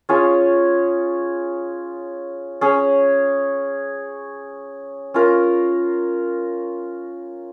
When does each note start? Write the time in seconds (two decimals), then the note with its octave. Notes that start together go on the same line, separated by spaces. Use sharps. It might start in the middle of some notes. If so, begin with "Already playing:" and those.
0.09 C#4 F4 G#4 C#5
2.61 C#4 G#4 C#5
5.14 C#4 F4 A#4